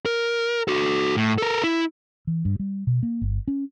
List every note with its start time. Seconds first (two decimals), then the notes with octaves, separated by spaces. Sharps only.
0.06 A#4
0.68 F#4 A4
1.17 A2
1.38 A4 A#4
1.64 E4
2.27 E3
2.45 G2
2.59 G3
2.87 B2
3.03 A#3
3.21 G1
3.48 C#4